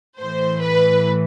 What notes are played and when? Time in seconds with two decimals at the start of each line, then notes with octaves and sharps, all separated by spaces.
0.19 A2 E3 C5
0.62 B4